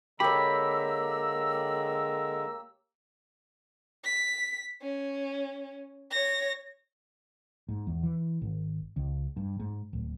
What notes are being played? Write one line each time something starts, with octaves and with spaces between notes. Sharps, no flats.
D3 G#3 A#3 G4 C#5 A#5 B5 E6
B6
C#4
C#5 A#6
G#2
E2
E3
G#1
C#2
G2
G#2
D1